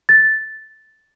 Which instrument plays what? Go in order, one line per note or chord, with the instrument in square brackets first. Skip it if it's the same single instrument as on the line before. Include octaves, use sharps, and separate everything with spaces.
[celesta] A6